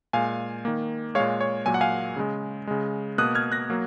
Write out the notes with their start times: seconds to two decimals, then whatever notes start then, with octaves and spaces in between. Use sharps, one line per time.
0.13 A#2 G#3 F5 G#5
0.65 D#3 A#3
1.15 G#3 C#5 F5
1.20 A#2
1.41 C#5
1.66 A#2 F#3 A#3 G#5
1.74 F#5
1.81 F5 G#5
2.16 C#3 G#3
2.67 C#3 G#3
3.18 B2 A#3 D#6 F#6
3.35 F6 G#6
3.52 F#6 A#6
3.70 F#3 A#3